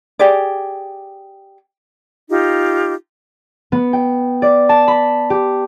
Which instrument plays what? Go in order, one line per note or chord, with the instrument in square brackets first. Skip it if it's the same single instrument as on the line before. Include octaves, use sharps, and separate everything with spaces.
[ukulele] G4 G#4 D5
[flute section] D#4 F4 G4
[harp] B3
G5
D5
A5
B5
G4